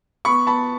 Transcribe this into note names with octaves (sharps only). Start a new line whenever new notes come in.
B3 B5 C#6
B3 A5 B5